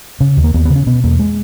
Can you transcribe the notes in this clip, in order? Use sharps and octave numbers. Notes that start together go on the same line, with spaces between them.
C#3 C#4
D#2
A#3
D#2 B3
C#3 B3
C#4
B2 B3
E2 A#3
G#3